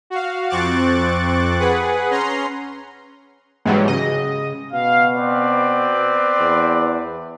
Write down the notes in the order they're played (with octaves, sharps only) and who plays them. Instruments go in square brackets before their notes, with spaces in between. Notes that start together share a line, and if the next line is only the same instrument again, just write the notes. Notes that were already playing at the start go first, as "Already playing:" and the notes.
[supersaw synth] F#4 F5
F2 C4 C#6 D6 F#6 A6
G#4 B4 F#5
C#4 A#5 C6
[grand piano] G#2 F#4 [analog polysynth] E3 F#3 G3
[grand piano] C#3 [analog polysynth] D#5
[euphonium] B2 [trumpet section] F5
[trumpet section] C4 B4 D5
[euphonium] E2